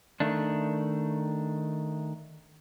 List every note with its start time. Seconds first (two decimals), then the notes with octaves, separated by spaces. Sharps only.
0.20 D#3 A3 D4